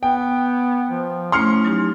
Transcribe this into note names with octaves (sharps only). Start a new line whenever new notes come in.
B3 G5
F3
A3 C#4 E4 C6 F6 C#7
F#3 D#4 G4